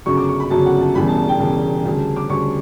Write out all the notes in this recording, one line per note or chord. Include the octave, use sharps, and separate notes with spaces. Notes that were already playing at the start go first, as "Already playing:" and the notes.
G1 F#2 C#3 F#3 C#6
D6
C#6
B5
G1 F#2 C#3 F#3 A5
F#5
A5
E1 E2 C#3 G3 B5
A5
A5
G5
E1 E2 C#3 G3 A5
D2 C#3 G3
D6
D2 C#3 G3 C#6